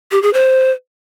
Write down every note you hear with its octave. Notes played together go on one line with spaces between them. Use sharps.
G4
G#4
C5